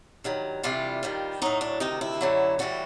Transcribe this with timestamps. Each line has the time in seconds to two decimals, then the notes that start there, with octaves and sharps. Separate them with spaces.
0.24 G2 D#3 F#3
0.63 D2 C3 E3 G3 F4
1.03 D#2 D#3 G3
1.42 A2 F#3 D#4
1.61 D4
1.80 D2 C3 D#3 D#4
2.01 E4
2.21 F#2 D3 F#3
2.59 A2 E3 G3 F#4